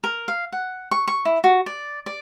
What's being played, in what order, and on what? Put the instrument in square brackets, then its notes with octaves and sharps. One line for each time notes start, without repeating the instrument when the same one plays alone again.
[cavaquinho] A#4
F5
F#5
C#6
C#6
E4
F#4
D5
D5